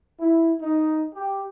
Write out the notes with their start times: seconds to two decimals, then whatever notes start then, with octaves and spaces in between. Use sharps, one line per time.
0.19 E4
0.60 D#4
1.13 G4